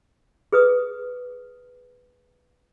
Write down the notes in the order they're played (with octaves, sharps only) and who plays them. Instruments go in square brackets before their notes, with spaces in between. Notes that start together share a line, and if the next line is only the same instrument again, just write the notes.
[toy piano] G#4 B4 D#6